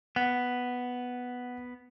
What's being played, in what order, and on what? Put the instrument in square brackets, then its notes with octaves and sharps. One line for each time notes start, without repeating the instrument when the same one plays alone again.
[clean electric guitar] B3 [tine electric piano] F#5